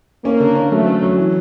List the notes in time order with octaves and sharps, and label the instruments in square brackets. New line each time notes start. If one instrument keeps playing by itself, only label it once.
[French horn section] A#3 [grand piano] C#4
[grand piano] D3
C#4
[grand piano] F#3 [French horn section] A3
[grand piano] C#4
F#3
E3